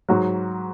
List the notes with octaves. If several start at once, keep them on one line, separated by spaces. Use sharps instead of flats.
G#2 F#3 F#4